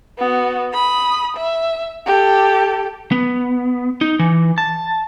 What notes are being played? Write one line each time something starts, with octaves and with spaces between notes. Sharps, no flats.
B3 F#4
B5 D#6
E5
G4 A4
B3
D#4
E3
A5